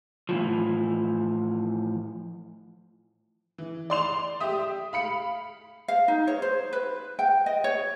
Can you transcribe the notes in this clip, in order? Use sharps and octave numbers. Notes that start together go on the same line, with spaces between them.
A2 E3 F3
E3
D5 C6 F7
G4 E5 D#6
F5 B5 C#7
F5
D#4
C#5
C5
B4
G5
D#5
C#5